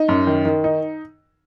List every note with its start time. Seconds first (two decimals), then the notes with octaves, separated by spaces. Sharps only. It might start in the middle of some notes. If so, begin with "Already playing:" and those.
Already playing: D#4
0.09 F#2
0.27 D#3
0.45 D#3
0.64 D#4